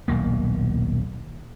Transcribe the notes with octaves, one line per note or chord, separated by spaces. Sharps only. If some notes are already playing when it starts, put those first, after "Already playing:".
D#1 B1 A#3